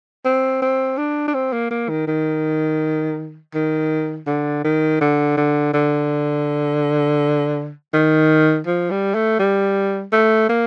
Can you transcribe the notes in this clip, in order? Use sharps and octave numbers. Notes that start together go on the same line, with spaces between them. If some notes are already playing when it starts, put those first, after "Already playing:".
C4
C4
D4
D4
C4
A#3
A#3
D#3
D#3
D#3
D3
D#3
D3
D3
D3
D#3
F3
G3
A3
G3
A3
A#3